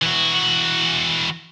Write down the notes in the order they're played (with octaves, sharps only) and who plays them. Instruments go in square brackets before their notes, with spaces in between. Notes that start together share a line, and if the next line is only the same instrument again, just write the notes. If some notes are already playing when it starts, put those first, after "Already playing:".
[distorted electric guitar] E3 F#4